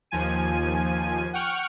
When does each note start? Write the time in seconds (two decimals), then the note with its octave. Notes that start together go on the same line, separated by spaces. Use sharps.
0.11 D#2 F3 G#5 D#7
1.33 F#5 G5 C#6 F6